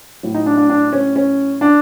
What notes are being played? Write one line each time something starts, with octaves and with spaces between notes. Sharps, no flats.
A2 F#3
D#4
D4
D4
D4
C#4
C#4
D4